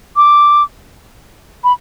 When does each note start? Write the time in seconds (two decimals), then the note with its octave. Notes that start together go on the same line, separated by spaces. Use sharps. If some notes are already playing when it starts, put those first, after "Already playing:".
0.16 D6
1.64 B5